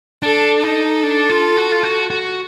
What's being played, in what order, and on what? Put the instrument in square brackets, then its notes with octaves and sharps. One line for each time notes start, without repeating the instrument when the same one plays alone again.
[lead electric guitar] D4 [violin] A4
[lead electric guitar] D#4 [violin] A4
[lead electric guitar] D4
F4
F#4
F4
F#4
F#4